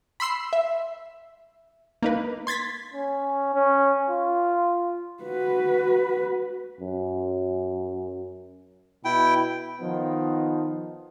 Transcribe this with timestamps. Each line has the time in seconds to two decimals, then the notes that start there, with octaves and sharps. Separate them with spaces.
0.20 B5 C6 E6 C7
0.53 E5
2.02 A#3 D#4 B4
2.47 C6 G#6 A6 B6
2.94 C#4
3.54 C#4
4.10 F4
5.23 F#4 B4
6.81 F#2
9.05 B2 E4 G5
9.80 D#3 F3 B3 D#4